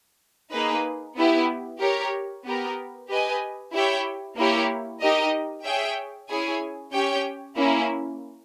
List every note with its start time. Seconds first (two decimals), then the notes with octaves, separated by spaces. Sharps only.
0.52 A#3 D#4 G#4 B4
1.17 B3 E4 G4
1.80 G4 A#4 C#5
2.44 B3 G4 A#4
3.09 G4 B4 D#5 G#5
3.73 E4 G4 C#5 E5 G5
4.37 A#3 E4 G4 C#5
5.01 D#4 G4 A#4 D#5
5.65 G#4 C#5 E5 G5
6.29 C#4 E4 G#4 C#5 G#5
6.93 C#4 G4 C#5 G5
7.57 A#3 C#4 E4